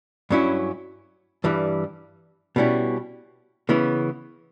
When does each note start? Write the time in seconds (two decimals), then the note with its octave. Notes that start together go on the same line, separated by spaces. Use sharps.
0.30 G2 F#3 C#4 E4
1.44 G2 E3 G3
2.56 B2 G3 C#4 E4
3.69 C#3 E3 B3 E4